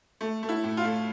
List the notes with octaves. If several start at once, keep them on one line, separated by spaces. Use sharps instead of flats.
A3
A3
E4
A2
F4
A3